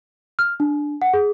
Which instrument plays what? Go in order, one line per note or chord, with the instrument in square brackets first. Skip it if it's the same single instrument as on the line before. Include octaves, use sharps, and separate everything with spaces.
[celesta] F6
D4
F#5
G#4